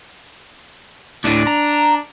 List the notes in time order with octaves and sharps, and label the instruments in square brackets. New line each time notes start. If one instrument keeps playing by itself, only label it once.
[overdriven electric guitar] D2 A2 [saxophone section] D4
[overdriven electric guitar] A#5